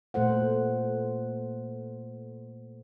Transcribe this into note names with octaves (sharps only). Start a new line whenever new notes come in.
A#2 A3 A4 C5 F#5